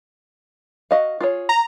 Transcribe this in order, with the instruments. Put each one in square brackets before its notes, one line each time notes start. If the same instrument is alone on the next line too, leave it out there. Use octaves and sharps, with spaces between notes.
[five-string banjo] F#4 D#5 F5
F4 G#4 C#5
[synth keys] A#5